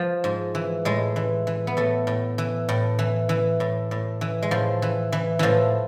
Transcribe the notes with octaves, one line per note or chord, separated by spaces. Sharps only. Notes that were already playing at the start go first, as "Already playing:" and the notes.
Already playing: F3
G#2
E3
A2 G#3
E3
E3
B3
A2 A3
A2
E3
A2
E3
E3
A2
A2
E3
G#3
A2 F3
E3
E3
A2 E3 F3